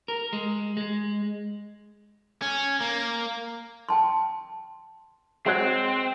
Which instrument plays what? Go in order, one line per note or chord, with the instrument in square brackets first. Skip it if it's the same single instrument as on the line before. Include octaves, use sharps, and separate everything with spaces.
[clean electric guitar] A#4
G#3
G#3
[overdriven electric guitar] C#4
A#3
[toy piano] G5 A5 C6
[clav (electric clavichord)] F#3 G#3 [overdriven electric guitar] C4